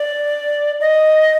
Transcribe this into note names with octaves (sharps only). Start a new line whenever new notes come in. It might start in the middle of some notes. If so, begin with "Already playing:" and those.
Already playing: D5
D#5